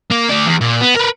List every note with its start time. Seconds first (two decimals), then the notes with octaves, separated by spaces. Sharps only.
0.10 A#3
0.29 A3 D5
0.45 E2
0.61 A#2
0.81 B3
0.97 A#4 B4